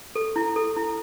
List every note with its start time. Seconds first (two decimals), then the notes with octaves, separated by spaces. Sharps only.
0.15 A4
0.36 E4
0.56 A4
0.76 E4